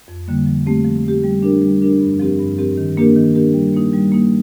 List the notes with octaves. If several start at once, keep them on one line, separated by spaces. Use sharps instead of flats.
F2
D3 G3 A#3
F3
A3 C4 G4
F3
A3 C4 G4
G3
D4 G4 A#4
G3
D4 G4 A#4
G2
F3 C4 G4 A#4
G2
F3 C4 G4 A#4
D#3
A#3 D4 G4 A#4
D#3
A#3 D4 G4 A#4
G3
A#3 D#4
G3
A#3 D#4